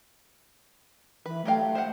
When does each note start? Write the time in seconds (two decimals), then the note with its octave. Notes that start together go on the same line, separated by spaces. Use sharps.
1.26 E3 B4
1.45 F#3 A3 G4 F5
1.75 C5 F5 F#5